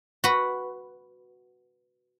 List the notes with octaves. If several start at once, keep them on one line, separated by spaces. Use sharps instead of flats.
F#4 B4